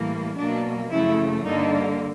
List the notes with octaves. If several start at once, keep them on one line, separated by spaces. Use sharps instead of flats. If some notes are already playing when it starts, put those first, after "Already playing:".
Already playing: A2 E3 G3 A#3
B2 F#3 A#3 D4
F#2 C#3 F3 A3 E4
G2 D3 G3 A#3 D#4